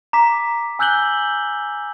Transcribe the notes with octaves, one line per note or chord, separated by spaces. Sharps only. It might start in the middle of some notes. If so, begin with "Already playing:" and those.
A#5 D6 B6
G#5 E6 F#6 G6 F#7 G7